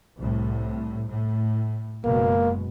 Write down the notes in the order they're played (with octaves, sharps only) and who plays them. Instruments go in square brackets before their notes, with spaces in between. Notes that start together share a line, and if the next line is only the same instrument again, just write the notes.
[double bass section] C2 A2
A2
[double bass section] F#1 B2 G#3 [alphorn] A#3